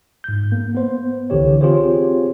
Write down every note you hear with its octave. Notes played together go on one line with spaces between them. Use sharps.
G#2 G6
A#3
B3 C5
C2 D3 E3 G4 C#5
C4 F4 G4 G#4 C5 C#5